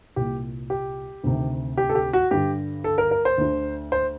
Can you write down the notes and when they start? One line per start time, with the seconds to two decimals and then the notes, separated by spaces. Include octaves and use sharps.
0.16 C2 A#2 G4
0.70 G4
1.24 D2 C3 D#3
1.77 G4
1.89 A4
1.95 G4
2.13 F#4
2.31 G2 D3 G4
2.84 A4
2.98 A#4
3.11 A#4
3.25 C5
3.38 D2 D3
3.92 C5